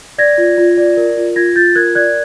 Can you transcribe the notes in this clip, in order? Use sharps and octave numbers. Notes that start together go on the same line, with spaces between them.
D5 G#6 A#6
F4
F4
D5
A#4
F4
F4 G#6 A#6
F4 G6 A6
A#4 F#6 G#6
D5 F#6 G#6